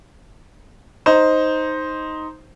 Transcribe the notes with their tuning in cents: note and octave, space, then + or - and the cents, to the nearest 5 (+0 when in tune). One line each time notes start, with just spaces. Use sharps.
D#4 +5 C5 +0